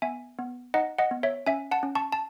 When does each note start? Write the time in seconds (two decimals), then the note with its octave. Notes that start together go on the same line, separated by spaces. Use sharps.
0.02 B3 E5 G#5
0.39 B3
0.74 D#4 D#5 F#5
0.98 D#5 F#5
1.11 B3
1.23 C#5 E5
1.46 C#4 E5 G#5
1.71 F#5 A5
1.83 C#4
1.95 A5 C#6
2.12 A5